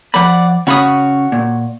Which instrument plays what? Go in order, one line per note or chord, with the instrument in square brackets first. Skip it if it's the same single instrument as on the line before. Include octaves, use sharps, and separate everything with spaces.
[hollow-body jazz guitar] F3 B5 [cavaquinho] D5 F#5
[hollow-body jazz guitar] C#3 C#4 B5 [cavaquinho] F#4 C#5 D#6
[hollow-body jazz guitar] A#2